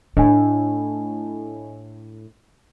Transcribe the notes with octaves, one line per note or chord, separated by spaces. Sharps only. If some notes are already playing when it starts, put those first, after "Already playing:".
A2 D4 D#5 G#5